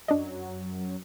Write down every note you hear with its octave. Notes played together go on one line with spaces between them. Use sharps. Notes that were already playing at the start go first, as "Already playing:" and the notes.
F#2 F#3 D4 D5 D#5